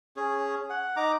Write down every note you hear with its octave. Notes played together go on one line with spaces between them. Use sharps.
C#4 G#4
F#5
D#4 A#5 D6